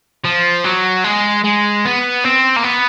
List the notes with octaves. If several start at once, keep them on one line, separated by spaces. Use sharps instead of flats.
F3
F#3
G#3
G#3
B3
C4
A#3
B3